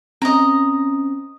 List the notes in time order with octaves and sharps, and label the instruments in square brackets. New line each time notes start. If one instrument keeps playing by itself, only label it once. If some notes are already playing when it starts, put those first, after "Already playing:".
[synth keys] C4 C#4 [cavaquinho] D#5 A#5